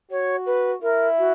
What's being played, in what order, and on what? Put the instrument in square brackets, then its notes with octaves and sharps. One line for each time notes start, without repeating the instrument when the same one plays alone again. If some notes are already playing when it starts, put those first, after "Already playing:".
[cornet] F#4 [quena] C#5
[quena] B4
[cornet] E4 [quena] A#4
[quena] F#4